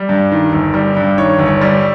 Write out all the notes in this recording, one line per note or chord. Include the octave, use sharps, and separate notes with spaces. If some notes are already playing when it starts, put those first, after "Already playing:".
Already playing: G3
G2
D#3
G1
G3
G2
D#3 C#5
G1
C#5
G3